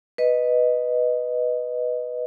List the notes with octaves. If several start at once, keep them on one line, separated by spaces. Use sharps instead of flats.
B4 D#5